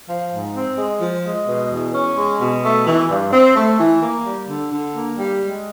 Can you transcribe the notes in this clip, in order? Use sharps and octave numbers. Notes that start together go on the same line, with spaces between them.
F3
G#2
C4
G#3
F3
G#3
B2
E2
C#4
G#3
B2
A3
E3
G2
C4
A3
E3
A#3
G3
D3
D3
A#3
G3
G#3